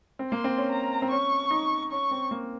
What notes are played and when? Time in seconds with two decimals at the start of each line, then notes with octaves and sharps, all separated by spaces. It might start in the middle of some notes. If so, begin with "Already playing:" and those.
0.19 C4
0.31 A#3 C6
0.44 C4
0.58 C#4
0.72 A#5
1.02 C4
1.11 C#4 C#6
1.51 D#4
1.91 C#4 C#6
2.11 C4
2.31 A#3